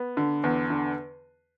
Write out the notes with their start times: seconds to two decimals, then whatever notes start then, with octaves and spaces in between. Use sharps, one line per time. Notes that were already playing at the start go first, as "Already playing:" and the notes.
Already playing: B3
0.17 D3
0.44 E2
0.70 D3